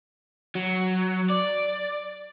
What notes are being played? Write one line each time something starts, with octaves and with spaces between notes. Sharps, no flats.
F#3
D5